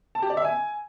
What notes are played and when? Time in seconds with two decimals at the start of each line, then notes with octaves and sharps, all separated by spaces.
0.15 A5
0.22 G4
0.30 D5
0.37 E5
0.44 G#5